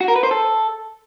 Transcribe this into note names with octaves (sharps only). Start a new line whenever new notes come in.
F#4
A#4
B4
C5
A4